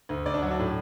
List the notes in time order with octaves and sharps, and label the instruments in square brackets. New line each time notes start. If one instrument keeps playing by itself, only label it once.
[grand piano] D2
D2 D5
D4
F#3 F#4
D4
A2